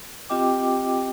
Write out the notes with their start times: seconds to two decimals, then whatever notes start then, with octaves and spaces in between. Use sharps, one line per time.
0.30 C4 F4 G4 D#5 G5 D6